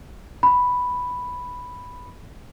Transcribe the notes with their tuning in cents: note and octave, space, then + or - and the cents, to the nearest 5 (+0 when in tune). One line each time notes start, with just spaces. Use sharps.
B5 +0